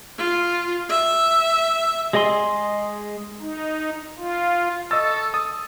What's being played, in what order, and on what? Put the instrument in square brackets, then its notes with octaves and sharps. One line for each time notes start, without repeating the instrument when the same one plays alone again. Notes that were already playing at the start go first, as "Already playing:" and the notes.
[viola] F4
E5
[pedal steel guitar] G#3 G#4 D#5 G#5 C6
[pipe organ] D#4
F4
[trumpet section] A4 [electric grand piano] D#5 C#6 A6 [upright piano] E6
[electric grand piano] D#6